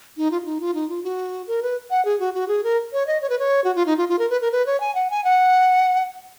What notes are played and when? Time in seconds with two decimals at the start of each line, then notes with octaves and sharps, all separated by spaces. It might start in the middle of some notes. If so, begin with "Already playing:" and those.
0.17 D#4
0.31 F4
0.42 F4
0.45 D#4
0.60 F4
0.74 D#4
0.89 F4
1.03 F#4
1.47 A#4
1.62 B4
1.90 F#5
2.05 G#4
2.20 F#4
2.34 F#4
2.48 G#4
2.63 A#4
2.93 C#5
3.07 D#5
3.21 C#5
3.29 B4
3.39 C#5
3.64 F#4
3.75 F4
3.86 D#4
3.97 F4
4.09 F4
4.19 A#4
4.30 B4
4.41 A#4
4.52 B4
4.66 C#5
4.80 G#5
4.95 F#5
5.10 G#5
5.24 F#5